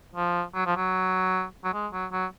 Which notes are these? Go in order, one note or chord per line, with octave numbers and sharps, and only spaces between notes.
F3
F#3
F3
F#3
F#3
G#3
F#3
F#3